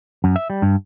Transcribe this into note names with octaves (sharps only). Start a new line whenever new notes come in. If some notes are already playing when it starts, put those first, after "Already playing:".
F#2
E5
G3
G2